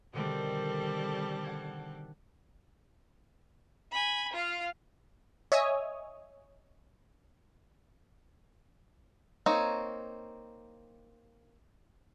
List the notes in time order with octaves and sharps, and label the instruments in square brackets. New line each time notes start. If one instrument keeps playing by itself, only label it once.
[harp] B2 D3 D#3 [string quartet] G3 C4 A4
[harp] F#5 G#6
[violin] G#5 B5
F4 F5
[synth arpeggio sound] C#5 D#5 E5 G#5 D#6
[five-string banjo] A#3 C4 D#4 C#5